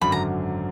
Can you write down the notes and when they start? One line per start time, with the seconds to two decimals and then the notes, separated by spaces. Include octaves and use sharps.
0.01 G#1 F#2 D3 F#3 B5
0.12 A#5